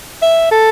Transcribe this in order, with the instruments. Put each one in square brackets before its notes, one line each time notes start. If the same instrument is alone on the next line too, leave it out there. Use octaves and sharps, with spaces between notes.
[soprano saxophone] E5
A4